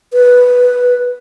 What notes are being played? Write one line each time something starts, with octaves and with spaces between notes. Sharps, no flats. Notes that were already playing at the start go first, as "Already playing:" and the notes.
B4